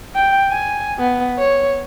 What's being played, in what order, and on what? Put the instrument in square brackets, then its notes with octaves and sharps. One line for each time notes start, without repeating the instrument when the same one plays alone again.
[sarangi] G5
G#5
B3
C#5